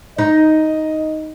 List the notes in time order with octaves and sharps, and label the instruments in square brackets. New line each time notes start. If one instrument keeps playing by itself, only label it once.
[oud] D#4 [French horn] D#5